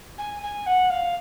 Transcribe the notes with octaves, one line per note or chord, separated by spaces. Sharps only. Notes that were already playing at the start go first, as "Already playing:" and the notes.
G#5
G#5
F#5
F5